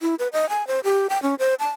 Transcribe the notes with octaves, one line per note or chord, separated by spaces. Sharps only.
E4
B4
D#5
G#5
C5
G4
G5
C#4
C5
A5